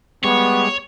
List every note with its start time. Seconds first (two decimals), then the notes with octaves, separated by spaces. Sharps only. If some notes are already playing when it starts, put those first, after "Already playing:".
0.24 G3 G#3 B3 C#5